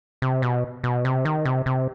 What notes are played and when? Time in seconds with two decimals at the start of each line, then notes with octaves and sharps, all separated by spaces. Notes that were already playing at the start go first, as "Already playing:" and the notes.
0.22 C3
0.42 B2
0.84 B2
1.05 C3
1.25 D#3
1.45 C3
1.66 C3